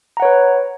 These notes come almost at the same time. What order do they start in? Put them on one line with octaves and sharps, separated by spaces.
A#5 F#5 C#5 B4